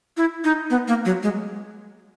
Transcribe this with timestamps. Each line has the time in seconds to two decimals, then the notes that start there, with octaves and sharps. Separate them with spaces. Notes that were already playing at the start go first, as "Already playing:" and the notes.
0.17 E4
0.44 D#4
0.70 B3
0.88 A#3
1.05 F#3
1.23 G#3